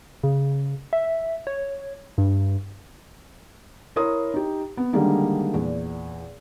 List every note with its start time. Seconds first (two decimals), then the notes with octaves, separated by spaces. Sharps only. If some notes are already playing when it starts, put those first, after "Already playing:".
0.23 C#3
0.93 E5
1.47 C#5
2.18 G2
3.96 E4 A#4 C#5 C6 D#6
4.34 D#4 G4
4.77 B3
4.93 D3 D#3 G3 G#3 A#3 D#4
5.54 E2 A#2